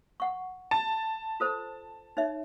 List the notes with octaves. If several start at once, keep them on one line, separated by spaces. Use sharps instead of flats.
F#5 C#6
A5
F4 A4 C5
D#4 C#5 E5